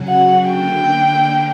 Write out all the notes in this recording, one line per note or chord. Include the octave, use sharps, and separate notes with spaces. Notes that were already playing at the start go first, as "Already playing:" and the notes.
Already playing: C#3 F#3 C#4 F#4
F#5
D3 A#3 D4 G5